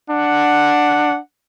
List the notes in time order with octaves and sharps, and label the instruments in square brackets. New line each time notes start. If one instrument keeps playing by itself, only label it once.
[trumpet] D4 [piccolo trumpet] F#5